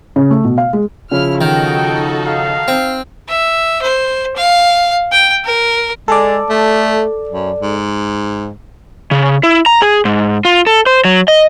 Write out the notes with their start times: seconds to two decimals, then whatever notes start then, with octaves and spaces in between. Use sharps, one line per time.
0.16 C#3
0.31 A3
0.44 B2
0.58 F5
0.73 G#3
1.11 C#3 F3 E4 F6
1.41 D#3 D#4 F#4 A4 G5
2.26 F5
2.68 C4
3.28 E5
3.82 C5
4.36 F5
5.12 G5
5.45 A#4
6.08 G#3 A4 D5
6.50 A3
7.29 F#2
7.60 G#2
9.11 C#3
9.43 E4
9.66 A#5
9.82 G#4
10.05 G#2
10.45 F4
10.67 A4
10.86 C5
11.05 F#3
11.28 D#5